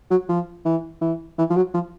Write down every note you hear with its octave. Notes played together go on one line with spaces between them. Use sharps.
F#3
F3
E3
E3
E3
F3
F#3
F3